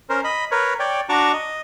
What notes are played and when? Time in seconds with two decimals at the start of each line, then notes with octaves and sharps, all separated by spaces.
0.10 C#4 A#4 C5
0.24 D#5 B5
0.51 A#4 B4 C#5
0.79 C#5 D5 G5
1.09 D4 F#4 A5 A#5 C#6 D6
1.33 D#5